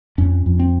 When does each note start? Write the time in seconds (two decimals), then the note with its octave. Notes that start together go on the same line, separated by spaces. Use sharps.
0.18 F2 C#4
0.46 F2
0.59 C4